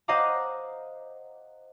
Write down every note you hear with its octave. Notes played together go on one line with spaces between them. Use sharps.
C5 D#5 F5 F#5 A#5 D6